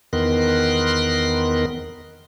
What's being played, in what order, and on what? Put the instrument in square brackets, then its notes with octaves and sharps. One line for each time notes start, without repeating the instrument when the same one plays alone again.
[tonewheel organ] E2 D#3 B3 A#4 C6 F#6